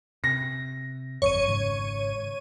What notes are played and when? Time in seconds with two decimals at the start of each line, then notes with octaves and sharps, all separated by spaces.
0.24 C3 A#6
1.22 G1 F2 C#5 C#6 D#7
1.47 G#1 G#2 C#3